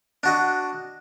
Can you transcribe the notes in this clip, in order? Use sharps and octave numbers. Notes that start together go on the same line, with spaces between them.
D4 F#4 D#5